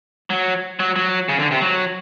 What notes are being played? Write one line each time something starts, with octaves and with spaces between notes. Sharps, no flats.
F#3
F#3
F#3
C#3
D3
C3
F#3